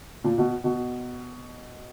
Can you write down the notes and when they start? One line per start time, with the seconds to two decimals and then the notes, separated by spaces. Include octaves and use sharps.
0.24 A#2
0.38 B2
0.64 B2